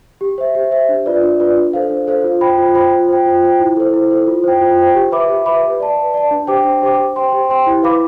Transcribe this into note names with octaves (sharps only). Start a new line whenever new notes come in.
G4
C5 E5
G4
C5 E5
D4
F4 B4 D5
D4
F4 B4 D5
D4
A4 C5 F5
D4
A4 C5 F5
F4
C5 G5 B5
F4
C5 G5 B5
F4
C5 G5
F4
C5 G5
E4
A4 C5
E4
A4 C5
F4
C5 G5
F4
C5 G5
G4
B4 E5 B5 D6
G4
B4 E5 B5 D6
B4
D5 A5
B4
D5 A5
D4
G4 C5 G5 D6
D4
G4 C5 G5 D6
G4
C5 G5 C6
G4
C5 G5 C6
E4
B4 F5 B5 D6